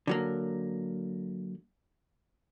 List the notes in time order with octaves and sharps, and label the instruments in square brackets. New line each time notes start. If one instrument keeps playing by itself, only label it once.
[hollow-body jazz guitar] D3 F#3 A#3